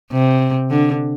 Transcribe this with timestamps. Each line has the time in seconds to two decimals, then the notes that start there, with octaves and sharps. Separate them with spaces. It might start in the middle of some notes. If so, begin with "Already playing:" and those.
0.11 C3
0.71 D3